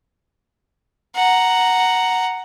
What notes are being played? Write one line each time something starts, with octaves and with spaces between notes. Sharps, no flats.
F#5 A#5